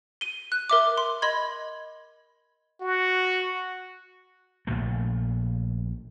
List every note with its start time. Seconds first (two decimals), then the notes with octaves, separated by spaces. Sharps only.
0.21 D#7 G7
0.52 F#6
0.69 A#4 E5 D6
0.98 C6
1.22 D#5 B5 C6 G#6
2.80 F#4
4.67 A#1 E2 A#2 A3